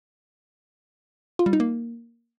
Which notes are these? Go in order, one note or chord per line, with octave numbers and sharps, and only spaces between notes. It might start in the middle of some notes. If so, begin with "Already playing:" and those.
F4
G3
D#4
A#3